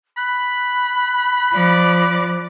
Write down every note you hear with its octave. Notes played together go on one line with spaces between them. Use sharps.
B5 F#6
F3 D5